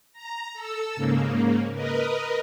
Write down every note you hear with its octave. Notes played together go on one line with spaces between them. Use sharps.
A#5
A4 E6
G#2 C#3 A#3
A#4 B4 D#5